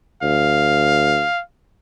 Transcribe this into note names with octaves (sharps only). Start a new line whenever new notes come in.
D2 F5